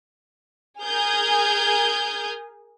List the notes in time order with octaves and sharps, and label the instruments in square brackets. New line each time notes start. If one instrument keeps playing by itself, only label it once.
[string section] G#4 A#4 D#6 F6 G6 G#6